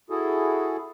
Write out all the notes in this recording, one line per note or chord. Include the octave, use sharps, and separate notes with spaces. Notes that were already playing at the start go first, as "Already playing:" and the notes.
E4 F#4 G#4 A4